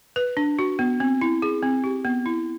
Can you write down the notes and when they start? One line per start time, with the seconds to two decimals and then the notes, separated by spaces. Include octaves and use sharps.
0.16 B4
0.37 D4
0.59 F#4
0.79 B3
1.00 C4
1.21 E4
1.42 G#4
1.62 C4
1.84 G4
2.05 B3
2.26 E4